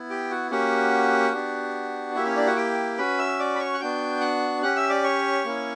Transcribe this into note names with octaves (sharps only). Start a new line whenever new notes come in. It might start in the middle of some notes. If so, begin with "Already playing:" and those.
Already playing: B3 E4
G4 G5
F#4 F#5
A#3 C#4 F#4 G4 F#5
B3 D4 G4
A#3 E4 G4 E5
C#4 C#5
D4 D5
F#4 F#5
G4 G5
C#4 F#4 B4 B5
E5 E6
D5 D6
B5
C#5 C#6
F#6
B3 D4 F#4 G5 G6
F#5 F#6
C#4 G4 F#5 F#6
E5 E6
D5 D6
C#5 C#6
A#3 C#4 E4